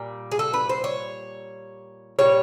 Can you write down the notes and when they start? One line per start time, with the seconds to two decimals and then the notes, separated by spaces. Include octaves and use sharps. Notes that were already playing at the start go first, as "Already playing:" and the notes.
Already playing: A#2 G3
0.32 G#4
0.39 A4
0.54 B4
0.69 C5
0.84 C#5
2.19 A#2 G3 C#5